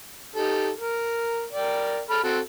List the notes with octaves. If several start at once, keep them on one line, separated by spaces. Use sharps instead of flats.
D#4 G4 A4
A#4
A#4 D5 G5
A4 B5 F6
C4 F#4 A4